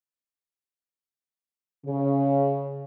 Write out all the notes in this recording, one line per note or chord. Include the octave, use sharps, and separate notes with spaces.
C#3